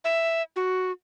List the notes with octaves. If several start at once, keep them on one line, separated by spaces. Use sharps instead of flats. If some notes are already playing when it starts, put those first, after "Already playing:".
E5
F#4